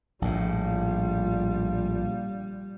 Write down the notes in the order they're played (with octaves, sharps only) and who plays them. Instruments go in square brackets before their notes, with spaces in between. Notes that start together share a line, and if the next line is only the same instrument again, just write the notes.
[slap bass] A#1 A2 [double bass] G3 [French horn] F4